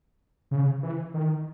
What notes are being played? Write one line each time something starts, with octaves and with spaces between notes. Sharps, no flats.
C#3
E3
D#3